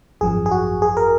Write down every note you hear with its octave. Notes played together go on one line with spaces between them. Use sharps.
G#1 F#2 F3 G#4
G#4
F#4
G#4
A#4